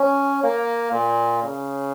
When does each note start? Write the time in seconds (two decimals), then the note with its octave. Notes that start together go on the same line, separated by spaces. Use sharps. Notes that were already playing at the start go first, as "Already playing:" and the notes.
Already playing: C#4
0.43 A#3
0.92 A#2
1.43 C#3